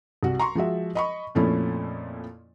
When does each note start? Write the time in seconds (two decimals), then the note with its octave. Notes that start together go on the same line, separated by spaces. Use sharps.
0.23 C2 F#4
0.40 A#5 C6 C#6
0.55 F3 G#3 F#4 E5
0.95 D#5 B5 C#6
1.35 F2 A#2 F3 A3 C#4 E4